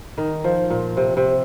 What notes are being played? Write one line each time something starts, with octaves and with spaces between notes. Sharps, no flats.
D#3
F3
A#2
C3
C3